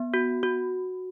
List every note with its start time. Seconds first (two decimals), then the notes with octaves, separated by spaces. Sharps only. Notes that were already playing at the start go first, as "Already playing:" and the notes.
Already playing: B3
0.14 F#4
0.43 F#4